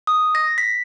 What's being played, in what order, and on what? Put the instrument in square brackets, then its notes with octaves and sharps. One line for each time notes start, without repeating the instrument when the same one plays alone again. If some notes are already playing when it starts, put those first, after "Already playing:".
[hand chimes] D#6
A#6
B6